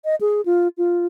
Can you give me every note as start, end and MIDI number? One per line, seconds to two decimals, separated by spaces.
0.05 0.15 75
0.21 0.41 68
0.46 0.68 65
0.78 1.06 65